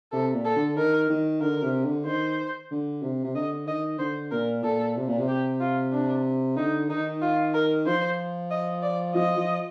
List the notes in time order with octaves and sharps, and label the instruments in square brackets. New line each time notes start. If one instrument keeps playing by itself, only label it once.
[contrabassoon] C3 [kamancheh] A4
[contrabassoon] A#2
[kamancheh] A4
[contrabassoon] D3
[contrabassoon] D#3 [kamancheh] A#4
[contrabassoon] D#3
[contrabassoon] D3 [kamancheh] A#4
[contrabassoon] C3
D3
[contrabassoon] D#3 [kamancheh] C5
[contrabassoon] D3
C3
C3
[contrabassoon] D3 [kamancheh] D#5
[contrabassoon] D#3 [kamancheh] D#5
[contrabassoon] D3 [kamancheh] C5
[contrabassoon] A#2 [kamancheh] A#4
[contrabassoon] A#2 [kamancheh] A4
[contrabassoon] C3
A#2
C3
[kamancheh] G4
F4
D4
[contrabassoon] D3 [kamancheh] D#4
[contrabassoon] D#3 [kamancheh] D#4
[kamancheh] F4
A#4
[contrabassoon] F3 [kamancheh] C5
[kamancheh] D#5
D5
[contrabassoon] F3 [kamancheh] D#5
[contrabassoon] F3